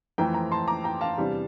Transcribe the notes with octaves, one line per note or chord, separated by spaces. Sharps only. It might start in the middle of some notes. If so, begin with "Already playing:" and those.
F2 E3 A3 C4 G5 A#5
G5 A#5
A5 C6
A#5 D6
G5 A#5
F5 A5
E2 C3 G3 D4